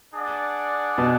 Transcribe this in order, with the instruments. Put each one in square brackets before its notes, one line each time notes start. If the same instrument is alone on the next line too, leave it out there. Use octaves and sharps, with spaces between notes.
[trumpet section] D4 G#4 D5 F#5
[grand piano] B2